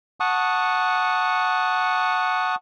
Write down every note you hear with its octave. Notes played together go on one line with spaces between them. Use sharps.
F#5 A5 C#6 D#6